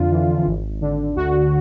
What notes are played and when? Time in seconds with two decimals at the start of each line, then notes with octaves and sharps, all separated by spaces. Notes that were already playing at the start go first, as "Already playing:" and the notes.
Already playing: F2 D3 F4
0.10 E3
0.46 G#1
0.81 D3
1.15 D2 F#4